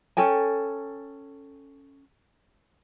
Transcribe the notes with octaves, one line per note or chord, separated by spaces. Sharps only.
C#4 A4 G5 G#5